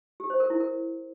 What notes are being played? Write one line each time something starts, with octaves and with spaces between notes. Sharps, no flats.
G4
C5
A#4
E4
A#4